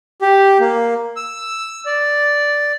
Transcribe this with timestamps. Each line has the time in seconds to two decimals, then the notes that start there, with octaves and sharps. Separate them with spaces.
0.22 G4
0.60 A#3
1.16 E6
1.86 D5